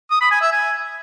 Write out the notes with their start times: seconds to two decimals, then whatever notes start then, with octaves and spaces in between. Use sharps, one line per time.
0.11 D#6
0.21 B5
0.31 G#5
0.41 E5
0.52 G#5